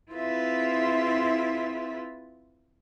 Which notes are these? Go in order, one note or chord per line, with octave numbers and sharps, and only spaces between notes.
C4 E4 F4 G#4 B4 E5